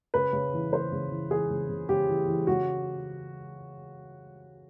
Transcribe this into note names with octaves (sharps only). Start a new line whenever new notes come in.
C#3 B4
C#3
E3
C#3 C5
C#3
E3
E3 G#4
C#3
C#3
C#3 G4
E3
E3
C#3 F#4